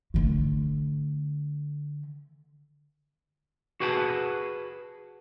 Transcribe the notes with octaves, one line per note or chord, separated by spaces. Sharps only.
D3 A3
F#4 G#4 B4 F#5 G5 A5